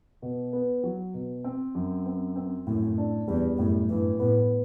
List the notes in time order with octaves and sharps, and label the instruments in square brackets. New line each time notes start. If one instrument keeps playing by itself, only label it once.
[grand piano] B2
B3
F#3
B2
C4
F#2
C4
C4
[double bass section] F#2 [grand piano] A2
[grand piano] D4
[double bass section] E2 [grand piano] G3
[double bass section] F#2 [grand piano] A2
[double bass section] G2 [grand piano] E3
[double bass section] A2 [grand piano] B3